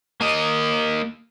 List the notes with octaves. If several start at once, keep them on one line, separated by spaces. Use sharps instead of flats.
A#3 D#5